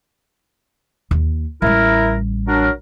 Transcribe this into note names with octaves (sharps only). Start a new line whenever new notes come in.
D#2
A1 G3 E4 A#4
F#3 D4 A#4